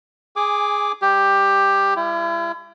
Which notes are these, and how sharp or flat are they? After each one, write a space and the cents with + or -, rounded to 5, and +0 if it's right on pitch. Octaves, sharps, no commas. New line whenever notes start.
G#4 +0 G#5 -20 D6 +0
G3 +0 G4 +10
G3 +35 E4 +40